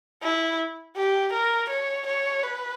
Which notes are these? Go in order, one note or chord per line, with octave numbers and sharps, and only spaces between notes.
E4
G4
A#4
C#5
C#5
B4